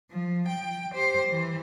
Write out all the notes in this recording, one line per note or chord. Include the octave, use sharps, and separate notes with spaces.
F3
G5
G4 C5
E3